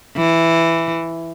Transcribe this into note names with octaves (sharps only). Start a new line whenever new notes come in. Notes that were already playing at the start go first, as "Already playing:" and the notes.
E3